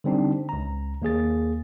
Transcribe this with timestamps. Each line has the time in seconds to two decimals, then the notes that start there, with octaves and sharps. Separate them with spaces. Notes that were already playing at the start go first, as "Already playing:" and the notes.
0.04 D3 G3 C4 D4 D#4
0.49 C#2 A#5
1.02 D#2 A#3 G#4 A6